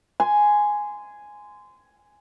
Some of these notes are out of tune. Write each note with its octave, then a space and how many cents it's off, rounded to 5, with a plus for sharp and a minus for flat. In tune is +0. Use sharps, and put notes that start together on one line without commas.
G#5 +0 C6 -20